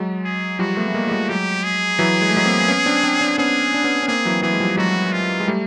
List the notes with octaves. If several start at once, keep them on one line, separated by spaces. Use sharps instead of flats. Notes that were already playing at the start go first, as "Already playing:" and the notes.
Already playing: F#3 G#3
G#4
F3 G3 F#4
A3 B3
A3
G#3 A#3
G#3
G3 A3
F#3 G#3 G4
G#4
E3 F#3
G#3
A3
F#3 G#3
A#3 C4
B3 C#4
C4 D4
C4 D4
C4 D4
B3 C#4 G#4
D4
B3 C#4
C#4
A#3 C4 G#4
E3 F#3
E3 F#3 G#4
G#3
F3 G3
F#3 G#3 F#4
F4
G#3
G3 A3